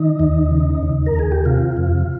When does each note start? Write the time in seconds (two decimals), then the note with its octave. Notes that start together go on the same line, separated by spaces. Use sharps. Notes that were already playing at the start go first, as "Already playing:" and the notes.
Already playing: D#3 D#4
0.19 D#2
0.51 C#3
0.83 D#2
1.06 A#4
1.14 D#2
1.19 G#4
1.32 G4
1.45 C3 F4
1.77 F2